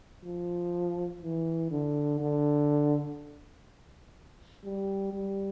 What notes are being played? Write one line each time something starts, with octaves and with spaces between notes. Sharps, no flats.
F3
E3
D3
D3
G3
G3